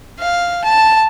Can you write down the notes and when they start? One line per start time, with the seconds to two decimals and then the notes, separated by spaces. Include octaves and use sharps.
0.19 F5
0.65 A5